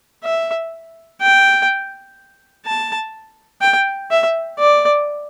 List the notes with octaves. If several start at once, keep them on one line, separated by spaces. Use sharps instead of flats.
E5
G5
A5
G5
E5
D5